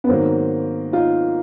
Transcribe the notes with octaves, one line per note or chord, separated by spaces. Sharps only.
B3
G#2 D#3 F#3 A#3 C4
D#4 F4